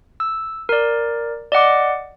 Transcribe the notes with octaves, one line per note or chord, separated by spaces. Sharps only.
E6
A#4 D5
D5 D#5 F#5 D6